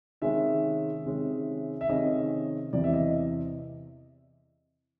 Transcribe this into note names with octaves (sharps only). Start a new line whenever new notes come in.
C3 D#3 G#3 C#4 E5
C3 D#3 G#3 C#4
E5
C3 D#3 G#3 C#4 D#5
E2 C3 E3 D5
E5
D#5